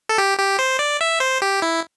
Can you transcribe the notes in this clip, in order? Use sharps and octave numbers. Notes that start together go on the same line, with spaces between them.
A4
G4
G4
C5
D5
E5
C5
G4
E4